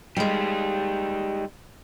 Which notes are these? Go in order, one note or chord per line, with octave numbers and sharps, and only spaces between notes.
G3 G#3 D#4 G4